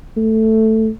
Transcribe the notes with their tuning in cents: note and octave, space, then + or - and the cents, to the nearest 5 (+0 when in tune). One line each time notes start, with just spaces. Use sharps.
A3 +5